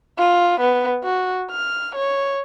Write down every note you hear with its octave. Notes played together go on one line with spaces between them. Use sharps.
F4
B3
F#4
F6
C#5